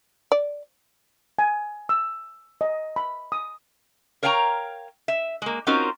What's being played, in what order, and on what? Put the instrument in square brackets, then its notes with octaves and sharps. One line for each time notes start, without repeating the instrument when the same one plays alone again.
[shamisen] D5
[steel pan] G#5
E6
D#5
B5
D#6
[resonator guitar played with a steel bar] A#4 C#5 F5 G5 G#5 A#5
E5
G#3 A#3
C4 C#4 D#4 F4 F#4 A#4